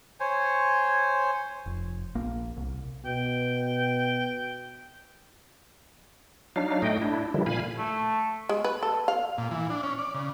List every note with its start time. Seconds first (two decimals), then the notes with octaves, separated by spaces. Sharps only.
0.20 C5 C#5 G#5
1.66 F1
2.15 A#1 A#3
2.57 C2
3.05 B2 G5
6.56 F#3 D4 D#4 F5
6.82 A2 A3 D#5 G5
7.02 D4 E4
7.34 D3 D#3 F3 G3 E4
7.46 A#2 F5 G#5 B5
7.78 A3
8.49 G#3
8.64 B4
8.83 A4
9.08 F5
9.38 A#2
9.51 E3
9.70 D4
9.83 C#4
9.98 D5
10.15 C#3